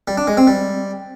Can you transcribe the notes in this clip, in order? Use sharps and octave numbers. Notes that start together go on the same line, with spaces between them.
G3
D4
G#3
C4
G3